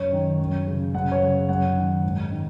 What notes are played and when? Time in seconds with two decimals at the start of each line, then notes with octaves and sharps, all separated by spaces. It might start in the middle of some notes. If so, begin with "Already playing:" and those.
Already playing: F#2 C#5
0.13 D#3
0.39 F#2
0.67 C#3
0.94 F#2 F#5
1.12 C#5
1.22 C#3
1.49 F#2 F#5
1.77 D#3
2.04 G#2
2.31 D#3